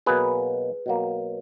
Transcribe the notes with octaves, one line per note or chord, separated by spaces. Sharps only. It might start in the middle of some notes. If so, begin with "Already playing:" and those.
B2 F#3 A#3 G#4 B4
B2 F#3 A#3